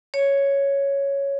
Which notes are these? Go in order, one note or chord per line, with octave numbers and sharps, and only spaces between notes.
C#5